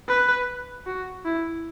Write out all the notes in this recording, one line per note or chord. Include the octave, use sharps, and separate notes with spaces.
B4
F#4
E4